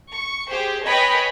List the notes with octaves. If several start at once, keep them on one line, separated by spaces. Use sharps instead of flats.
C#6
G4 G#4 C5
B4 C#5 D#5 G5 G#5 B5